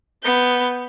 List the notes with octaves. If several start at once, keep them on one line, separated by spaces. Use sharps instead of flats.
B3 G6